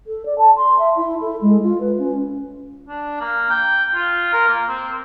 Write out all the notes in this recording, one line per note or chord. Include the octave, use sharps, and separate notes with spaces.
A4
D5
A5
C6
E5
E4
A4
G#3
F4
B4
C#4
D4
A#3
G5
F4
A#4
A#3
C4